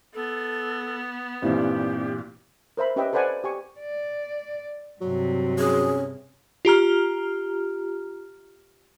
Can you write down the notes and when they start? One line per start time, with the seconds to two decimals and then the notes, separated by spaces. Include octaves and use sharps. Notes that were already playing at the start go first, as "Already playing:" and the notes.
0.14 B3 A4
1.42 G2 A#2 E3 C4 D#4 E4 G4
2.77 A#4 C5 E5 B5
2.96 C#4 G4 B4 D#5 E5 G5
3.13 A4 B4 C5 D5 F#5 G#5
3.44 G4 G#5 C#6
3.81 D5
5.01 G2 C3 F#3
5.58 C#4 G#4
6.65 F4 G4 A#5 F6